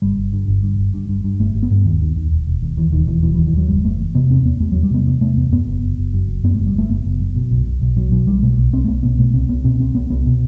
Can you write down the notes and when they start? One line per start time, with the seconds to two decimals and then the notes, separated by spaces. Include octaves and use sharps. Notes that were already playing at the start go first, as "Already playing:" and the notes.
0.02 G1 G3
0.18 G1
0.33 G2
0.48 G1
0.63 G2
0.78 G1
0.94 G2
1.09 G2
1.24 G2
1.40 G1 A3
1.55 G1
1.63 B3
1.71 G2
1.85 D#2 D#3
2.01 D#2
2.16 D#2
2.31 E1
2.47 E1
2.62 D#2
2.77 D#2 E3
2.92 E1 D#3
3.07 D#2 E3
3.23 E1 E3
3.34 E3
3.38 D#2
3.46 E3
3.54 D#2 F#3
3.68 F#1 G3
3.84 F#1 A3
4.00 E2
4.15 C3 B3
4.30 E2 C4
4.45 E2 B3
4.60 E2 A3
4.72 E2 F#3
4.83 G3
4.91 C3 B3
5.07 E2 B3
5.21 C3 A3
5.37 E2 B3
5.52 F#2 B3
5.67 F#1
5.83 F#1
5.98 F#1
6.14 F#2
6.28 F#1
6.44 F#2 B3
6.55 F#1 A3
6.66 G3
6.74 F#1 A3
6.89 F#1 B3
7.05 F#1
7.20 F#2
7.36 B2
7.51 B1
7.66 B1
7.82 B1
7.97 B2 F#3
8.12 B2 F#3
8.27 B1 G3
8.42 B2 A3
8.58 B1
8.73 B1 C4
8.84 A3
8.88 B1 B3
9.03 B2 B3
9.19 B2 A3
9.34 C2 C4
9.49 C2 B3
9.64 B2 C4
9.80 C2 C4
9.95 C2 B3
10.10 C2 B3
10.26 B2